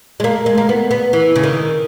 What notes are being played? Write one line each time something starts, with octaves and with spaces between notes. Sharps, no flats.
G#3
A#3
G#3
A#3
B3
B3
E3
C#3
D#3